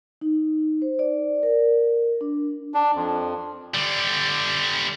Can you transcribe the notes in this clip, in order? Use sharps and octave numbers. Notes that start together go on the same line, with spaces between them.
D#4
C5
D5
A#4
D4
D4
F2
D3 G3